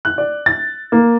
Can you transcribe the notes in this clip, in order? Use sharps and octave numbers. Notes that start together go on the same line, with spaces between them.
F#6
D5
A6
A#3